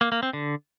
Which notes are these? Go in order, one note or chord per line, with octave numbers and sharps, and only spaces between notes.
A#3
A#3
C4
D3